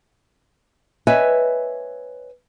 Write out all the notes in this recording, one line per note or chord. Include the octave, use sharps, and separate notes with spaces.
B4 C#5 D#5 E5 G#5